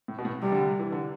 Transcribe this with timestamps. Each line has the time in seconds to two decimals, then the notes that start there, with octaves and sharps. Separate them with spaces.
0.08 A2
0.18 B2
0.25 A2
0.42 C3 G3
0.52 D3
0.63 C3
0.79 E3
0.92 D3